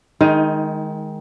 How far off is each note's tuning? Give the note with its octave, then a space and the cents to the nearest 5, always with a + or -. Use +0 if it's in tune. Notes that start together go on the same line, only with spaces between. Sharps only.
D#3 +0 G#3 +0 D#4 +30